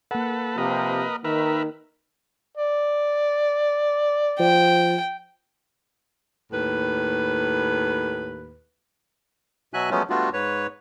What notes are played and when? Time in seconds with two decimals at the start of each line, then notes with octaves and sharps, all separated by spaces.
0.11 A#3 A4 B4 F#5
0.58 C3 F3 A#4 B4 D#5
1.25 D#3 A#4 B4 E5
2.57 D5
4.40 F3 G5
6.52 D#2 A2 B4
9.74 B2 F#3 F#4 E5 G#5 F#6
9.91 F3 F#3 G#3 A3 B3 C#4
10.10 G3 A3 B3 D4 F4 F#4
10.33 G#2 B4 C#5